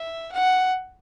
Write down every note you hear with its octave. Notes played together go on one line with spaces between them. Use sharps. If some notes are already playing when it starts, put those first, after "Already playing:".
Already playing: E5
F#5